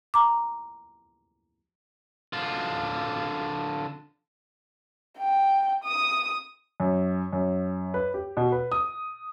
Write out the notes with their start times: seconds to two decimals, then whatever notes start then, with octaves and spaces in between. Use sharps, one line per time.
0.14 A#5 D6
2.33 D3 F4
5.19 G5
5.84 D#6
6.80 F#2
7.33 F#2
7.94 B4
8.14 G4
8.37 B2
8.52 B4
8.72 D#6